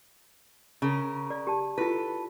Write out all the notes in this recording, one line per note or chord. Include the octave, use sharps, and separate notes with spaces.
C#3 A#4
D5
G4 A5
E4 F4 A4 B4